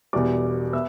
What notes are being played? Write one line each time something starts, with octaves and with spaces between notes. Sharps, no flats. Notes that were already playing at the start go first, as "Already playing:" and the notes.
E1 E2 B2 G3 D5 D6
B3 E5 E6